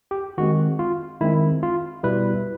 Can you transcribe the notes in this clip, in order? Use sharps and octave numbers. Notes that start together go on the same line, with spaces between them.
G4
D#3 G#3 C4 F#4
F4
D#3 G#3 C4 E4
F4
B2 G3 B3 E4 B4